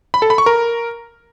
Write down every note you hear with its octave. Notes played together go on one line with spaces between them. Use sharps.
B5
A4
B5
C#6
A#4